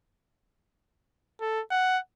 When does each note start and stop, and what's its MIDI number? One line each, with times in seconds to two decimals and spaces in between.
1.40 1.61 69
1.71 1.98 78